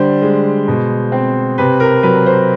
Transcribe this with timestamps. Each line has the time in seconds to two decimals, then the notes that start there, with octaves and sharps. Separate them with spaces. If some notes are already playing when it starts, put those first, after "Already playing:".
Already playing: D3 G3 C5
0.22 G#3
0.68 B2
1.12 C4
1.58 C3 B4
1.80 A#4
2.03 F#3 B4
2.26 C5